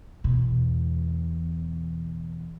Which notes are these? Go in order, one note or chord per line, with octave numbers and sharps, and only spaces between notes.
E2 B2